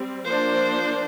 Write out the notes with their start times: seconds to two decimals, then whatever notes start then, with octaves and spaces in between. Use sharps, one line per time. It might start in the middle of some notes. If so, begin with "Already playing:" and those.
Already playing: G3 C4
0.28 F3 A#3 D4 C5